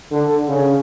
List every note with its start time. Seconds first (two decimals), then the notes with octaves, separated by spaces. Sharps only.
0.12 D3
0.48 C#3